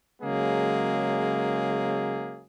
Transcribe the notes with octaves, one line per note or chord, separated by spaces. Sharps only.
C#3 F#3 G#3 A#3 G#4